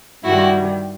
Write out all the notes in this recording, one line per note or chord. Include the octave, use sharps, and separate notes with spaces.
G2 D#3 G3 E4 F#4